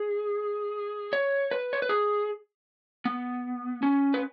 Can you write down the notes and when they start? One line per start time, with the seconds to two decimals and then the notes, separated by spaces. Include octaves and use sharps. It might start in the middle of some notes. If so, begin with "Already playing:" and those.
Already playing: G#4
1.13 C#5
1.51 B4
1.73 C#5
1.82 B4
1.89 G#4
3.05 B3
3.83 C#4
4.14 B4